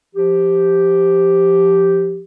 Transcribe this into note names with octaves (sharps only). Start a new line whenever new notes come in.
F3 G4